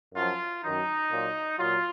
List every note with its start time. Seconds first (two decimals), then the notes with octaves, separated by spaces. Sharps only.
0.15 F#2 F3 F4
0.63 F#2 D#3 F#3 D#4
1.11 A#2 F#3
1.59 A#2 F#3 F4